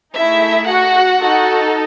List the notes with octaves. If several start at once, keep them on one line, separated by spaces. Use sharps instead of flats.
A3 D#4 E4 G#4 E5
F#4 F#5
D#4 F#4 A4